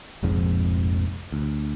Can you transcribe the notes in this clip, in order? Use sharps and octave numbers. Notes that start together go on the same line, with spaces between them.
F1 A#1 F2 G#2
D2